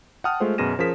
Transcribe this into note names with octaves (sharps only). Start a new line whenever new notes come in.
F#5 G5 A5 D#6 F6
G#3 A3 F4 C5
F#2 B2 G#4 A#6 D#7 E7
F3 C#4 G#4 A#4 B6 E7